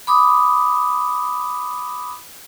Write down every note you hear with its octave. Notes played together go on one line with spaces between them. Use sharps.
B5 D6 D#6